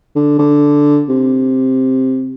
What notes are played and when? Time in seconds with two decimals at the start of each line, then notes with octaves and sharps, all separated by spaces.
0.16 D3
0.39 D3
1.09 C3